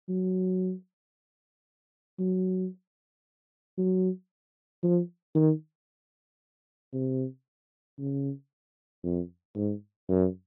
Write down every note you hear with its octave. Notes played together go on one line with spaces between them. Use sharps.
F#3
F#3
F#3
F3
D#3
C3
C#3
F2
G#2
F#2